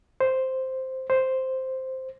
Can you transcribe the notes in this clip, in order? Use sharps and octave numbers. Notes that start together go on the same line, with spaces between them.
C5
C5